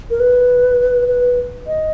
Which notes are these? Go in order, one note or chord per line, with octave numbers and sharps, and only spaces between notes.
A#4
B4
B4
D#5